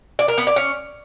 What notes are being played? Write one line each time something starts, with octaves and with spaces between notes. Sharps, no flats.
D5
A#4
B3
D5
C#4